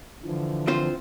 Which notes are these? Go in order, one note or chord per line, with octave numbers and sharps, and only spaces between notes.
D3 E3 F3
C4 F4 C5